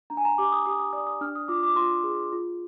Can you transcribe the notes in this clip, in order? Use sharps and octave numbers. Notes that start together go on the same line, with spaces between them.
D4 A#5
G#5
A#5
G4 D6
D#6
G4 D#6
D#6
D5 D#6
D#6
D4 F6
D#6
F4 D6
D6
F4 C6
G#4
F4